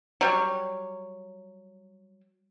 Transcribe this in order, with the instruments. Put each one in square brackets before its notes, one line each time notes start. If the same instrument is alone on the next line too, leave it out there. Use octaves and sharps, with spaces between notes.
[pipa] F#3 G3 C#5